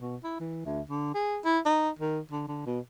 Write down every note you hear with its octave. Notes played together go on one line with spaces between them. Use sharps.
B2
E4
E3
D2
D3
G#4
E4
D#4
D#3
D3
D3
B2